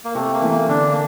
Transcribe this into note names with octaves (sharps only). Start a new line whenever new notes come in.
A#3
C3 A3
A#3
E3 A3
A#3
D3 D4
A#3